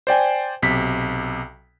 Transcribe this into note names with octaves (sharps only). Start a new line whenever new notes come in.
C5 D5 G5 G#5
B1 C3 B6